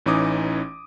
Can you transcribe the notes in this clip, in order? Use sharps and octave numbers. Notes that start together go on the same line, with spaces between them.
A1 E3 C#4 D#4 D6 D#6